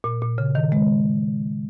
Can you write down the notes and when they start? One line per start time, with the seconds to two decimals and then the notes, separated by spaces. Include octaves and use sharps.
0.04 A#2
0.22 A#2
0.38 C#3
0.55 D#3
0.72 G#3